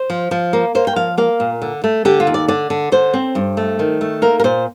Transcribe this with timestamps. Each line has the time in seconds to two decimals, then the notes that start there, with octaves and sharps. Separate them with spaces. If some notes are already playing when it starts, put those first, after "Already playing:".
Already playing: C5
0.10 F3
0.31 F3
0.53 A#3
0.75 A#3 C5
0.87 G5
0.96 F3 F5
1.18 A#3 F5
1.40 A#2
1.62 D3
1.84 A3
2.05 D3 G4
2.20 F4
2.27 D#2
2.34 D5
2.48 D3 D5
2.70 D3
2.92 D3 C5
3.14 C4
3.35 G2
3.57 A3
3.79 D#3
4.01 A3
4.22 A#3 A#4
4.40 A#4
4.44 A#2 C5